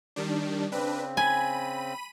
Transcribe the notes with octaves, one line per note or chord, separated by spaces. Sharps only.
D#3 G3 D4
C#3 C4 D4 B4
G#5 B5 D#7